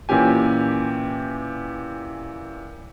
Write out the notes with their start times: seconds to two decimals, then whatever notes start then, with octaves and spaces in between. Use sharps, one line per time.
0.09 A#2 E3 C#4 G4 G#5